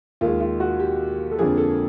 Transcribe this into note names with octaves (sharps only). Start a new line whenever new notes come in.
D#2 D#3 G#3 F4
F4
F#4
G4
A4
F2 D3 F3 A#3 G#4
A4